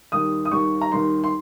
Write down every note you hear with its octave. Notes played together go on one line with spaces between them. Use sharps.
D#2 D#3 G3 D#6
D#6
D#2 D#3 G3 C#6
A#5
D#2 D#3 G3 C6
C6